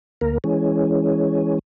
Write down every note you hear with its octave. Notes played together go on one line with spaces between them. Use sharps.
D2 A#3 A#4
E3 G#3 C#4